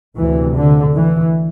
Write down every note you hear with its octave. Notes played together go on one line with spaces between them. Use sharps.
D2 C3 E3
D3
E3